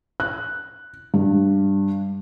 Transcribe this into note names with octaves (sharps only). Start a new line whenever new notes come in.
F#6
G2